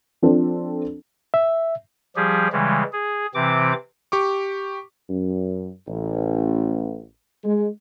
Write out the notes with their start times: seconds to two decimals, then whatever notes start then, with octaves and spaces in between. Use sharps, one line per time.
0.22 F3 C4 D4 A4
1.34 E5
2.16 F3 G3 G4 G#4
2.52 C#3 E3 G3 G#3
2.92 G#4
3.35 C3 E3 C4 D6
4.12 G4 C#6 D6
5.09 F#2
5.88 A1
7.44 G#3